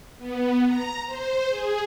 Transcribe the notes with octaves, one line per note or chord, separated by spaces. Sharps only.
B3
A#5
C5
G#4